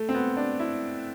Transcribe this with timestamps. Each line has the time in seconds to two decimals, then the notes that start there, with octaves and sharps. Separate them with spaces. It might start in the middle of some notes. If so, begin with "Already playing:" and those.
Already playing: A3
0.09 C4
0.14 B3
0.37 D4
0.60 E4